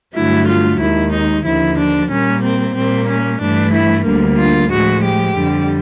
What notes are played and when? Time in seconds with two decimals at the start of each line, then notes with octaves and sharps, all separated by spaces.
0.15 G2 D3 F#3 A3 E4
0.47 F4
0.80 D#2 D#3 G#3 E4
1.12 D#4
1.45 D#2 D3 F3 E4
1.78 D4
2.10 A#2 G3 A#3 C#4
2.43 C4
2.75 A#2 G3 A#3 C4
3.08 C#4
3.40 G2 E3 A3 D4
3.73 E4
4.05 D2 D3 G3 A#3
4.38 F4
4.71 A2 F3 G#3 F#4
5.04 G4
5.36 F2 D3 G3